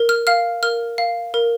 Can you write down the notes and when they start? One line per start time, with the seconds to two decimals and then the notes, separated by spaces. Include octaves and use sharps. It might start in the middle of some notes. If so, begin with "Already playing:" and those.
Already playing: A#4
0.09 F6
0.27 F5 F6
0.63 A#4 F6
0.98 F5
1.34 A#4